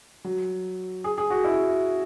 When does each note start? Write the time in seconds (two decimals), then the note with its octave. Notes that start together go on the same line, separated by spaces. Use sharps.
0.24 F#3
1.04 G#4
1.18 G#4
1.30 F#4
1.44 E4